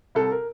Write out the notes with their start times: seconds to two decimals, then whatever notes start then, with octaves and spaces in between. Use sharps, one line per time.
0.15 C2 A4
0.31 A#4